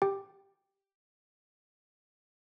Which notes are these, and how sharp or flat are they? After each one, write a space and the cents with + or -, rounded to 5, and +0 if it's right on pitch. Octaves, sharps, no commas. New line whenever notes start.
G4 +0 G5 +0